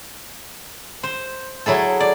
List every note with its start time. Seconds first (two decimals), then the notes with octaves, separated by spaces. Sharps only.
1.03 C5
1.66 F#3 E4 G#4 A4
2.00 D5